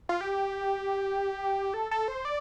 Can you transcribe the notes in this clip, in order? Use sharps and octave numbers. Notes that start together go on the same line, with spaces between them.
F4
G4
A4
A4
C5
D5